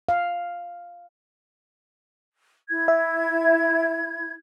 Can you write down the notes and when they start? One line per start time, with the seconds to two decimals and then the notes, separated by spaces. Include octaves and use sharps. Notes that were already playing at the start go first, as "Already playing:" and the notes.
0.09 F5
2.69 E4 G#6
2.88 E5